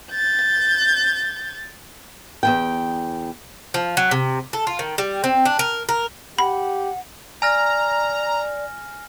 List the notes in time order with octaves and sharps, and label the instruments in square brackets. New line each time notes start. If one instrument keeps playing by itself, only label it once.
[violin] G6 A6
[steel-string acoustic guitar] E2 E3 G5
[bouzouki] F3
F#3
C3
A4
F4
D#3
G3
C4
D4
A#4
A#4
[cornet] G4 [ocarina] F#5 [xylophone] B5
[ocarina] D5 [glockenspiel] G#5 F6 A#6 [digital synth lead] A#5